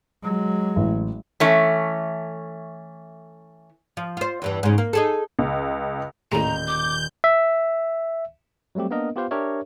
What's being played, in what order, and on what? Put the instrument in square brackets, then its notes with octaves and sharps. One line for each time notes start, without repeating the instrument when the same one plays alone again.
[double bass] F#3 G#3
[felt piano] A1
[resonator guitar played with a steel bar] E3 A3 C#4
[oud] F3
F4 C5
E2 G2 E3
G#2 C#3
A#3
D#4 G#4 A4
[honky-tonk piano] C#2
[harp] D#1 [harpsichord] A2 G#3 [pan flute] A#5 [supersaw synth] G6
[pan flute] D6
[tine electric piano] E5
F#3 G3 A3 C4 G4
A#3 B3 D4 A#4 D#5
B3 F4 G4 B4 C5 F5
D4 G4 A#4 C#5 E5